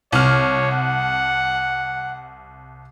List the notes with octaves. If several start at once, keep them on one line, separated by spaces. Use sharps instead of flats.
C2 C#5 F6
F#5